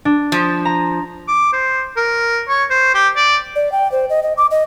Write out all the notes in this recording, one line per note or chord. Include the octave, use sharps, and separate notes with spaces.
D4
F3
A#5
D6
C5
A#4
C#5
C5
G4
D5
D5
G5
C5
D#5
D#5
D6
D#5